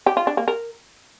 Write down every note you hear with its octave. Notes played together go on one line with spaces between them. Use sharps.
G4
F4
D4
A#3
A#4